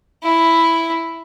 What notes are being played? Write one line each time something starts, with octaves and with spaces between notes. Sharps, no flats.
E4